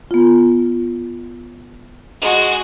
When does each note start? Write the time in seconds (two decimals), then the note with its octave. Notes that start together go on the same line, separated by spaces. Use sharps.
0.11 B3 F4
2.20 G#3 F#4